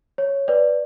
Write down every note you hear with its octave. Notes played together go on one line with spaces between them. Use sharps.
C#5
B4 D5